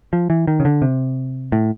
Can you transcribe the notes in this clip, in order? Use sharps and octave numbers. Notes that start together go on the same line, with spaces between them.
F3
E3
D#3
C#3
D3
C3
A2